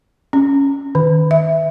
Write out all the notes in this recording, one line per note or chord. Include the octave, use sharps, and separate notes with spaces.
C#4
D#3
E5